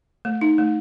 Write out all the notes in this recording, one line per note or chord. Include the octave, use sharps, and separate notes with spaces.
A3
D#4
A3